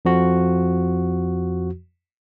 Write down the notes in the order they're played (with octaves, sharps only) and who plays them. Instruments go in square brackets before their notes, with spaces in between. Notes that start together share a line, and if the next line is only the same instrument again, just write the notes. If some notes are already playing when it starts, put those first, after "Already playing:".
[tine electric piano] F2 F3 F#4